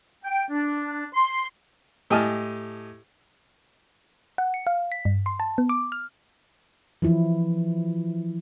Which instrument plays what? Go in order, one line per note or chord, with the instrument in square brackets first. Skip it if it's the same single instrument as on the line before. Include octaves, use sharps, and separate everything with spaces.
[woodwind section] G5
D4
C6
[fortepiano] A2 G4 D#5 G#5 A5 F6
[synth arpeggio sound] F#5
C#7
F5
B6
G2
C6
A5
B3
D6
F6
[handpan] E3 F3 E4